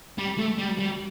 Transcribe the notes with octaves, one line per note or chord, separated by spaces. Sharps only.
G3
A3
G3
G3